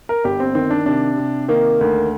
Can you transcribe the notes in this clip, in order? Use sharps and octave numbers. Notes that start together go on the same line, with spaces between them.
A#4
G1 G4
C4
D#3 C4
D4
C3 D4
C3
D#3 A#3
D2